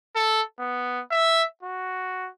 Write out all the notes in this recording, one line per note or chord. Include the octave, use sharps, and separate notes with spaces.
A4
B3
E5
F#4